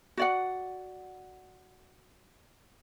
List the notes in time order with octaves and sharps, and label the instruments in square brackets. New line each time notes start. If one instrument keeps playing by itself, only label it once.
[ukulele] F#4 D5 F#5